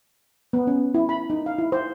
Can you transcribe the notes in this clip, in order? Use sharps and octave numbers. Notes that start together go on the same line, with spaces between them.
B3
C#4
E4
B5
D#4
F5
E4
C5